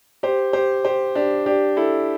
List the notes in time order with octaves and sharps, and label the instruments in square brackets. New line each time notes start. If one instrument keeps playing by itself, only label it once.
[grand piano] G4 C5
G4 C5
G4 C5
D4 G4
D4 G4
E4 A4